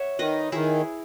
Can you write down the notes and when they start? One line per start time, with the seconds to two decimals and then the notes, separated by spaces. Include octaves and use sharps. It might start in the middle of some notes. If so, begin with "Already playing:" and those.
Already playing: C#5 E5 F#5
0.19 D#3 B4 D#5
0.52 D#3 E4 G#4